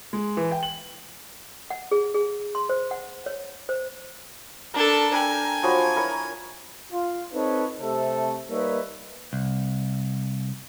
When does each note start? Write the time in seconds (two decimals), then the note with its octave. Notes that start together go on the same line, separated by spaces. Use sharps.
0.13 G#3
0.37 E3
0.51 G5
0.63 F#7
1.70 F#5
1.91 G#4
2.14 G#4
2.55 C6
2.69 C5
2.91 F#5
3.26 C#5
3.69 C5
4.74 D4 A4 A#4
5.14 A#4 G5 G#5
5.63 F3 F#3 B5
5.96 E4 A#4 C#5
6.91 F4
7.33 C4 D#4 A4 B4 C#5 D#5
7.80 C3 A3 A4
8.50 G3 A#3 D#4 B4 C#5 E5
9.33 C2